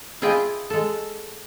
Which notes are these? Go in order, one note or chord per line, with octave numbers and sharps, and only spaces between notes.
E4 F4 G#4 D#5 G5
G#3 A4